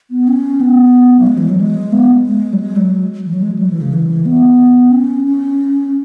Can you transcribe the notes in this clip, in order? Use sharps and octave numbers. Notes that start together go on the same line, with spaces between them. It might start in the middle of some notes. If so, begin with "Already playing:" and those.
B3
C#4
B3
F#3
G#3
E3
F#3
G#3
B3
G#3
F#3
G#3
F#3
E3
F#3
G#3
F#3
E3
C#3
E3
B3
C#4
C#4